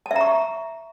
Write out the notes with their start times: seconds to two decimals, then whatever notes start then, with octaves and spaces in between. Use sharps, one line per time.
0.06 A5
0.11 E5
0.16 A#5
0.21 C#6